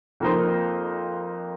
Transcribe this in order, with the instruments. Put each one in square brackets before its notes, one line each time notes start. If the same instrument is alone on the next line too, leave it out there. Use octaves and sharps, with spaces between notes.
[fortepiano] F2 F3 A#3 D#4 C5